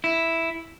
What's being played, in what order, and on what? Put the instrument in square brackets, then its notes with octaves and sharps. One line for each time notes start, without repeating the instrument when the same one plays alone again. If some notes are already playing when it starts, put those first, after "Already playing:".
[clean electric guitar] E4